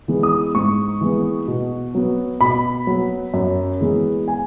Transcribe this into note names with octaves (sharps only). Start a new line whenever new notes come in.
E3 G#3 B3
D#6
G#2 C#6
E3 G#3 B3
B2
F#3 B3
B2 B5
F#3 B3
F#2
E3 G#3 B3
G#5